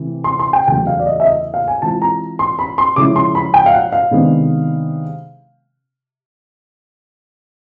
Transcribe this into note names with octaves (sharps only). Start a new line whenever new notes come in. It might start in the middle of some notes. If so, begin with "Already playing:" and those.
Already playing: C3 E3 A3
C6
C6
G5
E2 C#3 F#3 A3 G5
F5
D5
D#5
E5
D#5
F5
G#5
E3 G#3 C4 F4 A5
A#5
C6
B5
C6
C#3 F3 G#3 C#4 E4 D6
C6
B5
G5
F5
F#5
F5
C3 D#3 G#3 B3 D4